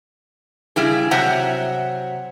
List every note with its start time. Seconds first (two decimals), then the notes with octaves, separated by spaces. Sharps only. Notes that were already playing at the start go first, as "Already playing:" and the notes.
0.76 C#3 G3 E4 G#4
1.11 C3 F#3 C5 E5 F#5 A#5